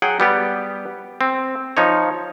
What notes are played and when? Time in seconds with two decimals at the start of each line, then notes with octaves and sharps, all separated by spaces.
0.02 F#3 G#4 F#5 G5
0.20 G3 B3 G4
1.21 C4
1.77 F3 D#4 C#5